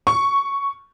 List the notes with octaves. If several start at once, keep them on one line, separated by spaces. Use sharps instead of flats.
C#6